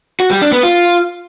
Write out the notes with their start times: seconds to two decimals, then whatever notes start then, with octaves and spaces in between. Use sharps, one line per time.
0.20 F#4
0.31 G3
0.42 D4
0.52 B3
0.63 F4